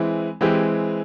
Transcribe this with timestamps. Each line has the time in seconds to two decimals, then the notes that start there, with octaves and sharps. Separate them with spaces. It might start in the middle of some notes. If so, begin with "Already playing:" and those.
Already playing: E3 G#3 C4 E4
0.41 E3 G#3 C4 E4 G4